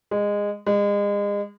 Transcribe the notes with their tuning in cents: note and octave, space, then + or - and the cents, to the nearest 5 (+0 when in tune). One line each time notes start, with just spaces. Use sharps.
G#3 -20
G#3 -35